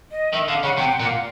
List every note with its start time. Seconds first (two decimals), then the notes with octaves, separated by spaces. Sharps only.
0.12 D#5
0.33 D#3 E5
0.48 D3 F5
0.63 C#3 F#5
0.77 C3 G5
0.92 F#5
1.00 A#2
1.06 F5